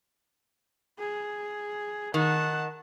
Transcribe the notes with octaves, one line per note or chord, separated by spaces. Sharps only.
G#4
D#3 F#5 A5